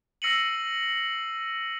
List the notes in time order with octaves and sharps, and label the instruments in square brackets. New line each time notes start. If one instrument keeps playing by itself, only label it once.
[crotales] E6 A#6 C7 C#7 D#7 F#7